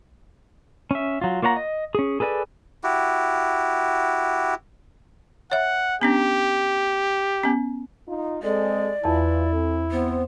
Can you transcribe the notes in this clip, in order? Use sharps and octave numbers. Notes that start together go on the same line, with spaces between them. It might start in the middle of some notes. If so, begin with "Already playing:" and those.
C#4 E5
F#3 F4
A#3 F4 C#5 F#5 A#5
D#5
C#4 G#4
G#4 A4 B4 D5 G#5
E4 F#4 G4
C#5 E5 F#5
B3 C#4 D4 G4
B3 C#4
D#4 F4
G#3 C4 G#4 A4 D5
E2 E3 E4 F4 A5
C4 A4
B3 C4 C5